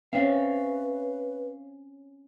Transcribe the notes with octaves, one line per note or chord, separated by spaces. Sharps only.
C4 C#4 B4 C#5 E5 F5